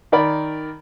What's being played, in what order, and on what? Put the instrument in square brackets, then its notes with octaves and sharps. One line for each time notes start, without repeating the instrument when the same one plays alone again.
[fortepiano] D#3 A#4 D5 B5